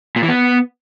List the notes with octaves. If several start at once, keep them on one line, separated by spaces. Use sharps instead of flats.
A#2
E3
B3